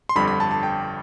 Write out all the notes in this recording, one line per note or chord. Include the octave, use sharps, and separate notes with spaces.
C6
G1 F2 D3 G3 B5
B5
A5
A5
G5